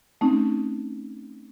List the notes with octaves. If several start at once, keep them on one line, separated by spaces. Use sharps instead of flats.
A3 C4 C#4 D#4